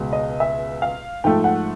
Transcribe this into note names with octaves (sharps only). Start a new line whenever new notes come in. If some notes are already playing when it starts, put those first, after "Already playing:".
Already playing: C#2 B2 G#3
D#5
E5
F5
G#2 F3 A3 G5
F#5